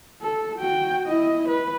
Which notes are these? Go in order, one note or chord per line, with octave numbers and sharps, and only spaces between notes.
A4
F#4 G5
E4 D#5
B4